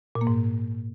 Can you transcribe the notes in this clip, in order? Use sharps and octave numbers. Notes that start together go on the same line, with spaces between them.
A#2
A#3
G#2